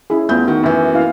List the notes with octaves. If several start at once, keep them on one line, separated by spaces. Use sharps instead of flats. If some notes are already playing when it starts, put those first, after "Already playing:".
C#4 E4 G#4
E2 A3 B3 F4 G6
D#3 F#4
F#2 E3
A#3 E4 F5